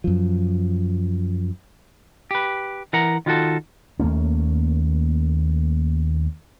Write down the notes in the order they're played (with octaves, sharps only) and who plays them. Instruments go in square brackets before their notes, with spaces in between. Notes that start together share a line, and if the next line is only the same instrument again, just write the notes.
[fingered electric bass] F#2 F3
[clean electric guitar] G4 B4
E3 A#4 F#5 A#5
D#3 F4 F#4 A4
[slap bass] D#2 A3 A#3 C#4